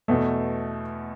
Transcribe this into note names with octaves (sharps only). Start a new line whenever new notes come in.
E2 B2 A3